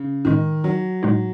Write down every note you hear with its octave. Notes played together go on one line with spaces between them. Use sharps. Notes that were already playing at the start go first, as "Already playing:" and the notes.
Already playing: C#3
A2 D#3 G#3 D#4
F#3
A2 G#3 D#4